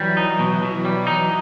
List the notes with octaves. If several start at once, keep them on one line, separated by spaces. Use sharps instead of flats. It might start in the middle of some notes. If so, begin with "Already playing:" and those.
Already playing: E3 F#3 G3
D#4
B2
B2
G3
D#4